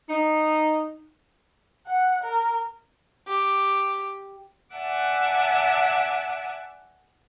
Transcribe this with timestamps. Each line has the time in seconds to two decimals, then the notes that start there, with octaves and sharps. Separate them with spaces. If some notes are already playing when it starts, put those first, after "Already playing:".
0.09 D#4
1.87 F#5
2.24 A#4
3.27 G4
4.74 D5 E5 F#5 G#5 A5